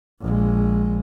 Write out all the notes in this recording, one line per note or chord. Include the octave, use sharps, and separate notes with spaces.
A#1 G#3